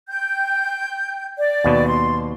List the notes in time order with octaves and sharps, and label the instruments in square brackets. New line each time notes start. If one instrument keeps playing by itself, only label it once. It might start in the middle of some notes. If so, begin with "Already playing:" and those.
[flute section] G5 G6
D5
[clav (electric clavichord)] D#2 B2
[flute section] C6